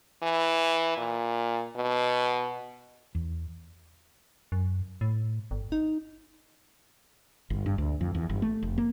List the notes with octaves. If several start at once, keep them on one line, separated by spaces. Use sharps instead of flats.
E3
A#2
B2
E2
F#2
A2
G1
D#4
G1
G2
D2
F2
E2
G1
A3
F1
A#3